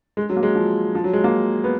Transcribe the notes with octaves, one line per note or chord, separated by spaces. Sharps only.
G#3
F#3
A#3
G#3
F3
F3
F#3
G#3
A#3
B3